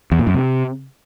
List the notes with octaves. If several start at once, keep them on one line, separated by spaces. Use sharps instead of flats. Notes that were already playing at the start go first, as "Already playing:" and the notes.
E2
A#2
F#2
C3